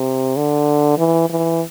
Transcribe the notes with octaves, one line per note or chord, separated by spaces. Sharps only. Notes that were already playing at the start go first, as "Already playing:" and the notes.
Already playing: C3
D3
E3
E3